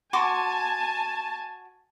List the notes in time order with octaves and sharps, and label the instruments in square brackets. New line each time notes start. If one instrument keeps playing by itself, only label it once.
[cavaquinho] F#4 C6 D6 [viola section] G#5 A5